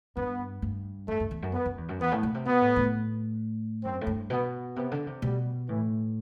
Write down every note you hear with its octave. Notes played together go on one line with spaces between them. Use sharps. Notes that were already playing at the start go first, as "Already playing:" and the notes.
G2 B3
G2
F#2 A3
F#2
E2
F#2
B3
F#2
E2
F#2
E2 B3
A2
B2
C3
B2 B3
A2
A2
F#2 C4
A2
G2
B2 B3
C3 B3
D3
C3
B2 G3
A2 E3